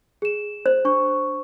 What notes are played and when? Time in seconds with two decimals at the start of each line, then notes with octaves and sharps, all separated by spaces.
0.22 G#4 E7
0.66 C5
0.85 D4 C#6